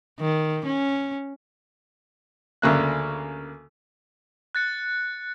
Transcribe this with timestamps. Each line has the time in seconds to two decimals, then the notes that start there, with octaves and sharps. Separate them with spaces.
0.20 D#3
0.66 C#4
2.62 D2 C#3 A#3 F#6
4.55 F#6 A6 C#7